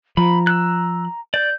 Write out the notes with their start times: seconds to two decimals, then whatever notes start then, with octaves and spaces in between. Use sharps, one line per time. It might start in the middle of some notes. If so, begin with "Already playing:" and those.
0.17 F3 A#5 B5
0.47 E6 F#6
1.34 D5 G6